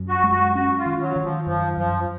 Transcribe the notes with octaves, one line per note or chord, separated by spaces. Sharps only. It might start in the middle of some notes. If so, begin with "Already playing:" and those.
Already playing: F#2
F#4
G#3
F#4
C#4 F#4
F4
D#3
F#3
D#3
F3
F#2 F3
F#2 F3